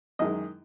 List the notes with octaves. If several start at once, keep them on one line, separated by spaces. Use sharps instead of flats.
F#2 D#3 G#3 D#5